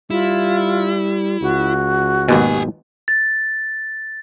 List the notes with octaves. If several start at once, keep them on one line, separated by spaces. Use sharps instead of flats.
G3 E4 F4
C#2 F#4
G#1 D#2 B2 G4 G#5
A6